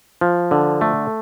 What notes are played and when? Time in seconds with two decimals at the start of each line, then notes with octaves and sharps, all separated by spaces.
0.21 F3
0.51 D3
0.81 A3